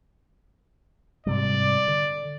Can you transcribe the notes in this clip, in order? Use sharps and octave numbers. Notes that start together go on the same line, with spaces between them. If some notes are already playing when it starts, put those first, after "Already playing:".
G#2 C3 G3 D5
D3